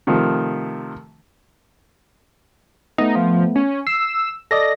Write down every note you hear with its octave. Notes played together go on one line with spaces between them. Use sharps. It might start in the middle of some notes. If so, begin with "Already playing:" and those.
C3 D#3 F3 A3
A3 B3 D#4
F3
C#4
E6 C7
A4 D5 D#5 A#6